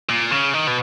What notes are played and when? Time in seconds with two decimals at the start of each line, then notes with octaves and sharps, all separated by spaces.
0.10 A#2
0.31 C#3
0.54 D#3
0.67 B2